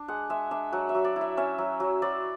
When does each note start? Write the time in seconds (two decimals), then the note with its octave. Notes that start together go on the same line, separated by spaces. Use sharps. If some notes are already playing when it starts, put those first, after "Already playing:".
Already playing: D4
0.08 G#3 F#5
0.30 G#3 E5
0.51 D4 E5
0.72 F#3 F#5
0.89 E5
0.95 F#3
1.05 D5
1.16 E4
1.21 E5
1.37 C#4 E5
1.58 F#3
1.80 F#3
2.02 F#3 D5